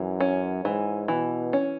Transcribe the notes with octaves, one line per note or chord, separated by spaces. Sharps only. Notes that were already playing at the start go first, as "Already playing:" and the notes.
Already playing: F#2 E3
C#4
G#2 E3
B2 E3
C#4